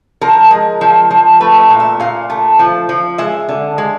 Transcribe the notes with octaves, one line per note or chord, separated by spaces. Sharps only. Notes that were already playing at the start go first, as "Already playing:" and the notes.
F3 A#4
G#3
F3
F3
A3 B4
E5
A#2
E5
A#2 F5
A3
F3
F3
G#3 E5
D3
G#3